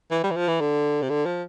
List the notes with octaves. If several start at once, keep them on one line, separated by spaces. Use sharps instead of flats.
E3
G3
E3
F3
E3
D3
C3
D3
F3